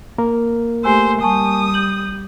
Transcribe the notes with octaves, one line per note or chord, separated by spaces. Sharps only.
A#3 A#4
A3 G4 C5 G#5 E6
G3 G#5 A5 C#6 D#6
G6 F#7